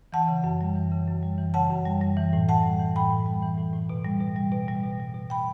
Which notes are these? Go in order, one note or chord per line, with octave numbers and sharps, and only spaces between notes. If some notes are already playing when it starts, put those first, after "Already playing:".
E3 F#5 A5
C#3
F#2
G3
E3
C#3
F#2
G3
E3
C#3 F#5 A5
F#2
G3
G3
E3
A2
A2 F#5 A5
G3
E3
A2 G5 B5
A2
G3
E3
A2
A2
B2
G3
B2
G3
B2
G3
B2
G3
B2
G3 G5 B5